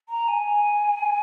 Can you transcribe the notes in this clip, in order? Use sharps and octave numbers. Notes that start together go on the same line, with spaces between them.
A#5
G#5